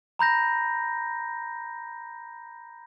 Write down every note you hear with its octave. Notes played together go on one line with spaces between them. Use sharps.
A#5 B5 G6 A#6